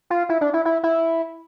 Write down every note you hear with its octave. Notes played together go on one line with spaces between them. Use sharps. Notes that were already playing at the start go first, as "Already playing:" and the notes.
F4
E4
D4
E4
E4
E4